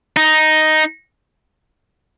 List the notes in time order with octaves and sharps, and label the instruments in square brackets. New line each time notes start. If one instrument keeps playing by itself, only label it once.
[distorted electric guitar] D#4